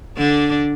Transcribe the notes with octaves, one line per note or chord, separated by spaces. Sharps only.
D3 D4